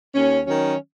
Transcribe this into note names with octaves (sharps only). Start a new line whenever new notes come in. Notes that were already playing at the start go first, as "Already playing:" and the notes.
D#2 C#4
D#3 F#3 C#4